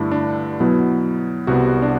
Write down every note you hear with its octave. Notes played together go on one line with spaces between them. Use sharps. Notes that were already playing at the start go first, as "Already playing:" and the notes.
Already playing: G2 D3 A3 D4 E4
D4
B2 F#3 B3 E4
C2 C3 G3 B3 F#4
D4